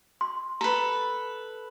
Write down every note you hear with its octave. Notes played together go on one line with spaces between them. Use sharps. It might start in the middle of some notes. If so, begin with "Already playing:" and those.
C6
A4 B4 A#5